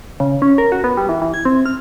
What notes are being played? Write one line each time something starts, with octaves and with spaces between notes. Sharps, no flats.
C#3
C#4
A#4
F#4
B3
G3
E3
E3
G#6
C4
F6